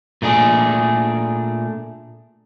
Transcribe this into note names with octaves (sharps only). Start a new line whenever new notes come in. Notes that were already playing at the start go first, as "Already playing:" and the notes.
A#2 A3 D4 G#4